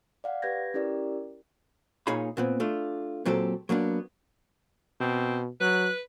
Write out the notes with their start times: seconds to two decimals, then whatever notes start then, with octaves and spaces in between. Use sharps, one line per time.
0.24 D5 F5 F#5
0.42 G4 B4 G6 G#6 A#6
0.74 C#4 E4 G4 A#4 D5
2.07 A#2 D#4 G#4 C#5 F5 B5
2.37 A#2 B3 C4
2.60 A3 D4 F4
3.25 A#2 F#3 C4 G4 A4
3.69 F#3 A#3 B3 D4
5.01 B2 C4
5.61 F#3 B4 F#6